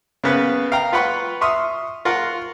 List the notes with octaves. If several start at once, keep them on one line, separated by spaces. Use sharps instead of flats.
C#3 A#3 B3 B4
F5 G5 A#5
F4 B4 F#5 G5 B5 C#6
E5 C6 C#6 D#6 F6
F4 A#4 F#5 C#6